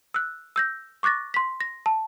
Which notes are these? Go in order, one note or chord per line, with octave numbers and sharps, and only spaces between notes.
E6 F#6
E6 G6 A#6
C#6 D6 F#6 A6 A#6
C6 B6
A#6
A5